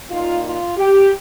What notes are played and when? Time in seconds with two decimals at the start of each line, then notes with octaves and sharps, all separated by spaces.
0.11 A#2 A#3 D#4 F4
0.44 F4
0.78 G4